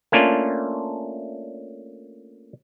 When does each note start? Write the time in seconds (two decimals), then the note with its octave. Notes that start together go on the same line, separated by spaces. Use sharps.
0.12 A3 A#3 C#4 D4 F4